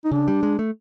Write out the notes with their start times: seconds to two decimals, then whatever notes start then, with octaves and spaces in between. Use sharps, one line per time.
0.05 D#4
0.11 C#3 D4
0.28 G3
0.43 G#3
0.59 A3